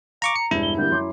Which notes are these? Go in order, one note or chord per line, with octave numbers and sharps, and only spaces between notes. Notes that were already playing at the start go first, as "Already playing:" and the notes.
F5 A#5 C#6 D6
A#5 C#7
E1 G2 E4
G7
D3 G3 A#3 G6
F#2 C6 D6